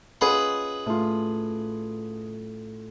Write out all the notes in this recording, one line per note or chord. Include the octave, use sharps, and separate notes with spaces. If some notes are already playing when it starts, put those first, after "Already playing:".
C#4 F4 G#4 B4 D#5 F#5
A2 F4